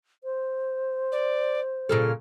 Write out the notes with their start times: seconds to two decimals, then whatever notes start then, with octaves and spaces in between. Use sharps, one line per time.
0.24 C5
1.11 D5
1.89 A#2 C#3 A4 F6